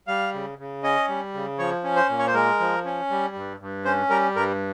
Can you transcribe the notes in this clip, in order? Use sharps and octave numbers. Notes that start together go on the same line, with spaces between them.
G3 F5
C#3
C#3
C#4 D#5
G3
C#3
F3 C#5
C#4
C5
A#2
C#5
C5
G#3 A#4
F3
C#4
G3
G2
G2
C#4 C5
G3 A#4
G2 A#4